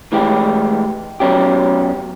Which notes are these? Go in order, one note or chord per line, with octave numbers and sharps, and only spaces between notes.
A2 E3 G#3 G4
B2 F#3 C#4 G4